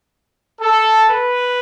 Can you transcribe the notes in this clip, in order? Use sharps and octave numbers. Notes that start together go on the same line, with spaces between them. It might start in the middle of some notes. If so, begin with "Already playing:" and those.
A4
B4